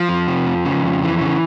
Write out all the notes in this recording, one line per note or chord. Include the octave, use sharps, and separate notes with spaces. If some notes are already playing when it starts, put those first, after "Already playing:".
Already playing: F3
F2
C3
F2
C#3
F2
E3
C#3